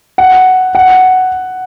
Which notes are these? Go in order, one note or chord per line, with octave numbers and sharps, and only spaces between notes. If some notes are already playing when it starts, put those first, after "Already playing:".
F#5
F#5